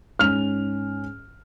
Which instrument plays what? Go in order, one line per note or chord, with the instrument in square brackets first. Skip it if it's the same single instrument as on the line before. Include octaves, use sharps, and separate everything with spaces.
[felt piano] G#2 C#4 [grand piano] F6 F7